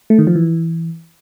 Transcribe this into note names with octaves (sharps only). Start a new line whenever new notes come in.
A3
D#3
F3
E3